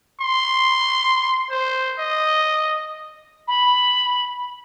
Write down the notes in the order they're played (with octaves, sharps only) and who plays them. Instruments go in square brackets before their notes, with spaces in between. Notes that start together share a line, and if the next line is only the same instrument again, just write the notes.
[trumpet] C6
C5
D#5
[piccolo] B5